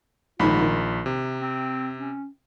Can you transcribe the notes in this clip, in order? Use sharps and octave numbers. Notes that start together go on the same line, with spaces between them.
A#1 G#2 D#3 F4 B5
D#3
C3
C4
C#4